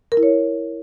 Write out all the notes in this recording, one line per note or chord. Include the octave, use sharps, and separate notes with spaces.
A#4
E4
C#5